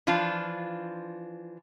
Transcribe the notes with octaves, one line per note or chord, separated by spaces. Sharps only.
E3 F3 D4 F4